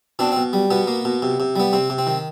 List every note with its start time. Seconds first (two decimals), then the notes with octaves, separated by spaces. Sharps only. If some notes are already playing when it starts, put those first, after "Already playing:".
0.19 B2 C4 D4
0.32 C4
0.37 B2
0.53 G3
0.70 B2 B3
0.88 A#3
1.05 B2
1.23 C3
1.40 C3
1.56 G3 B3
1.73 C3 C4
1.90 C3
1.98 C4
2.07 D#3